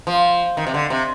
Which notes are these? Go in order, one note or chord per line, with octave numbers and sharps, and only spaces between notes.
F3
D#3
C3
D3
C3